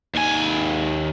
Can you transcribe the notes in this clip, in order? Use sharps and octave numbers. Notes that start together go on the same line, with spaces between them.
D#2 G#5